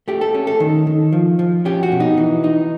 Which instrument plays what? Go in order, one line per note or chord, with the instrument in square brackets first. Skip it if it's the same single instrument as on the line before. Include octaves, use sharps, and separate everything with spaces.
[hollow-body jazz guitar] A3 G4
A4
C#4
A4
D#3
D#3
F3
F3
C#4 G4
F#4
B2
D#4
E3
D#4